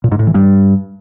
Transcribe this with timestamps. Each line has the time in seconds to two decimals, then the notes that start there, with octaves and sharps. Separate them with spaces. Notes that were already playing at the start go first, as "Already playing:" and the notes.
0.04 A#2
0.12 G#2
0.19 A2
0.27 E3
0.35 G2